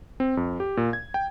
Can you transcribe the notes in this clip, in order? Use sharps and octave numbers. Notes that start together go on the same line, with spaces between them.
C4
F2
G4
A#2
G#6
G5